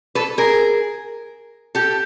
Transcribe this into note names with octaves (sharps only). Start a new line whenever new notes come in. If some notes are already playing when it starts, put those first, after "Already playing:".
A4 B4
G#4 A#4
G4 A4